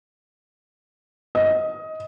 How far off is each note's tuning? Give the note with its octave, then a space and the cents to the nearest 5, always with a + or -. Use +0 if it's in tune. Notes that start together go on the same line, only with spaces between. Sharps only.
D#5 +15